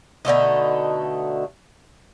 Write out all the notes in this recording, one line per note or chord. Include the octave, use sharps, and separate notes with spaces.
B2 D3 A3 D#4